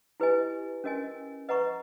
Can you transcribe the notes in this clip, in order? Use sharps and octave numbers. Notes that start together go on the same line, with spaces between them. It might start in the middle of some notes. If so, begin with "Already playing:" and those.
E4 G4 B4 D#5 G#5
C#4 F#4 A#4 D#5 G#5
B4 D#5 F#5 A#5 C#6